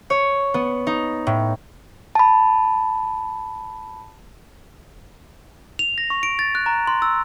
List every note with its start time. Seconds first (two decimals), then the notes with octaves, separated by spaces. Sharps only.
0.10 C#5
0.54 B3
0.87 D#4
1.27 A2
2.15 A5 B5
5.79 F7
5.98 A#6
6.10 C#6
6.23 D7
6.39 A6
6.55 F#6
6.66 A#5
6.87 C6
7.02 E6